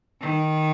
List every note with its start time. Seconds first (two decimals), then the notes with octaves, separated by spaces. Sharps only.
0.21 D#3